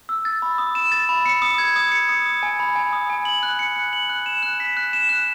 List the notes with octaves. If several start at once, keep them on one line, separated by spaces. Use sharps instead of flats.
E6
A6
B5
D#6
E7
A6
B5
C#7
D#6
G#6
D#6
C#7
D#6
D#6
G#5
B5
G#5
D#6
G#5
F#7
F#6
C#7
F#6
F#7
F#6
E7
F#6
B6
F#6
E7
F#6